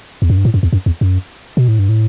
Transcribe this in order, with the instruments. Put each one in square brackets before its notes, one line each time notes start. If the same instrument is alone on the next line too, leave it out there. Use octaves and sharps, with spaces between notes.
[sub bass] E2
F#2
G2
A2
F#2
E2
F#2
E2
F#2
B2
A2
G2
A2